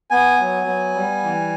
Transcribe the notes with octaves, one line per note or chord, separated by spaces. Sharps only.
B3 G#5
F#3
B3
G3
E3